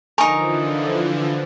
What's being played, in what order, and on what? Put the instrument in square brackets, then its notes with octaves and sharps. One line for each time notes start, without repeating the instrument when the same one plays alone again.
[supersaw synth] D3 E3 F3 [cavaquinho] D#4 A#4 [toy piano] G#5 C#6